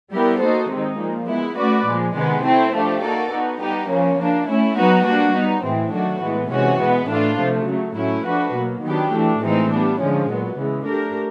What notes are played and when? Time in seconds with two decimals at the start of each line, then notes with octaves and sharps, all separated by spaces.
0.13 G3 B3 E4 G4 A#4
0.41 A#3 D#4 F#4 A4 C5
0.70 C3 D#3 G#3 C4 D#4
0.99 A#2 F3 A#3
1.28 G#3 B3 E4
1.57 A3 C#4 F#4 B4 D5
1.87 A#2 F3 G#3
2.16 C3 D#3 G#3 B3
2.45 A3 C4 E4
2.73 F3 A3 D4 G4
3.03 A#3 D#4 F#4 A4 D5
3.32 B3 D#4 F#4
3.60 G3 B3 D#4 G4
3.89 C#3 F3 A#3 C#4
4.19 F3 A#3 D4
4.48 A3 C#4 E4
4.77 F#3 B3 D#4 F#4 B4
5.06 G3 A#3 D4 F#4
5.35 G3 B3 D#4
5.64 A2 E3 G#3 C4
5.93 D#3 F#3 A3 D4 F#4
6.22 A2 E3 G#3 B3
6.51 C3 E3 G#3 C#4 F#4
6.80 B2 G#3 B3
7.09 A2 E3 A3 D4 F4
7.39 C3 F3 A3
7.68 C#3 F#3 A3
7.96 A2 F#3 A3 C#4 E4
8.25 F3 A3 D4 F#4 B4
8.54 B2 F#3 A#3
8.83 D#3 F#3 B3 D4 G4
9.13 E3 A3 D4
9.41 A2 E3 G#3 C4 D#4
9.70 G3 B3 D4
10.00 D3 F3 G#3 C#4
10.29 A#2 F#3 B3
10.57 C#3 E3 G#3
10.87 A3 D4 G4 A#4